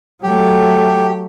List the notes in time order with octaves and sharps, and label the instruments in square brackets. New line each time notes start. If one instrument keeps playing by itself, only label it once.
[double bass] F#3 A3 [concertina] G4